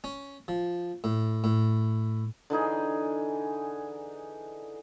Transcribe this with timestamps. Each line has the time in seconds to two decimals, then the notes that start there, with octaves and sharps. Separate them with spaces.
0.04 C#4
0.48 F3
1.04 A2
1.44 A2
2.50 D3 E3 D#4 G#4